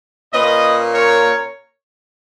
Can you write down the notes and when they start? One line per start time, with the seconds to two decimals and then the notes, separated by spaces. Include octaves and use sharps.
0.32 A#2 A#3 C#4 B4 D#5
0.93 A#4 C#5